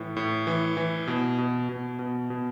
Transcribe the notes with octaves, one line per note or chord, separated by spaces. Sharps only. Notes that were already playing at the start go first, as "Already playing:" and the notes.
Already playing: A2 E3
A2
E3
E3
B2
B2
B2
B2
B2